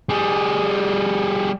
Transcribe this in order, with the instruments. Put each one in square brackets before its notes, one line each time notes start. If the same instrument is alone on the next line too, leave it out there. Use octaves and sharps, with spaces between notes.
[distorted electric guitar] G3 G#4